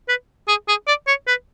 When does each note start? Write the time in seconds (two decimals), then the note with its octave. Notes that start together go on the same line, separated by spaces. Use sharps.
0.09 B4
0.48 G#4
0.68 G#4
0.87 D5
1.07 C#5
1.28 B4